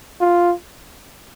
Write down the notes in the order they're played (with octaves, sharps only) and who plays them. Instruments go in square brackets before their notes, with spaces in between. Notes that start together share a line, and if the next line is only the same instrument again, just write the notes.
[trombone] F4